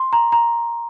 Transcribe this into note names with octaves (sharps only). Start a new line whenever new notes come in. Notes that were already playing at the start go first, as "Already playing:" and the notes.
Already playing: C6
A#5
A#5